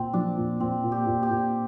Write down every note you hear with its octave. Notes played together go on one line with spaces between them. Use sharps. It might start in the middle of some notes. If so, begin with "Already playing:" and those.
Already playing: A#2 C4
F3 D4
A#2
A#2 C4
A#2
G4
A#2
G4
A#2